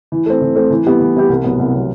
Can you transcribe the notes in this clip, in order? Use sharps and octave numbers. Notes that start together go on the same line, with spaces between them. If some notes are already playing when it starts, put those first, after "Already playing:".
E3
A3 C4
E3
A3 C4
E3
G3 B3 E4 G4
E3
G3 B3 E4 G4
C2
B2 F#3 B3
C2
B2 F#3 B3